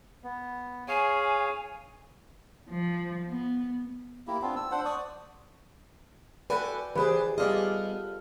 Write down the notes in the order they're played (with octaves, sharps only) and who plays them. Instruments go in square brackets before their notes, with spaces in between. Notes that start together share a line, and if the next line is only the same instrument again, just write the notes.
[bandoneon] B3
[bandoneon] G#4 C#5 F5 [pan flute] G#5
[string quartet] F3
B3
[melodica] A#3 E4 G4
B3 C4 D4 F4
E6
D4 C5 F#5
D5 C#6 D#6
[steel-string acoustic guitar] F#4 A4 G#5 [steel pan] B4 [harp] D5 G5
[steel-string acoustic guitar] E3 C5 D5 [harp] G4 [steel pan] G#4 B4
[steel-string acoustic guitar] G3 B3 D#5 [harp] F4 A4 F5 [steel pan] G#4 D5